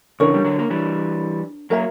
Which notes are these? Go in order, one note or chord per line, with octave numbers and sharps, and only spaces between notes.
C#3 E3 D4 A#4 C#5
G3
D3 F#3
A#3
E3 G3
F#3 A#3 A#4 E5 A#5